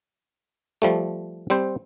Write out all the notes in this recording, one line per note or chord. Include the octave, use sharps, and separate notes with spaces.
F3 G3 A3
G3 C4 C5